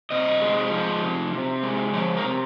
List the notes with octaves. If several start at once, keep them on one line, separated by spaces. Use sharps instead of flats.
C3 D#5
G#3
F3
C3
C3
G#3
F3 C#5
A#4
C3